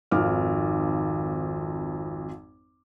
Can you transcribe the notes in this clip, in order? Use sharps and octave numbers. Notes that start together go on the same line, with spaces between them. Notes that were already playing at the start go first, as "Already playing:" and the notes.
G#1 F2 D#3 D6 F6